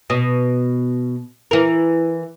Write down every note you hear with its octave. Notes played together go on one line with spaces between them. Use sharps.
B2
E3 A#4